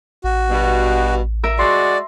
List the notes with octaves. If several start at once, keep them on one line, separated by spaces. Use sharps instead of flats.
A1 F#4
G2 B2
A#4 E5
G#3 F#4 D5 C6